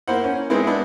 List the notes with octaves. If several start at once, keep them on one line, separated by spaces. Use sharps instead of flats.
A#3 E4 C5 F#5
C#4
G#3 B3 C4 E4
B3 D4 E4